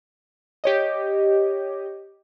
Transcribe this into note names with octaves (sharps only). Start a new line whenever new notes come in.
G4 C#5 D#5